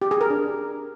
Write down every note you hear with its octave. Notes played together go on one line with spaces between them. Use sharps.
G4
G#4
A#4
D4